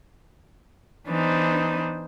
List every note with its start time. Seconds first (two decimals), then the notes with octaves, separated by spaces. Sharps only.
1.09 E3 B3 D4 D#4 B4 C5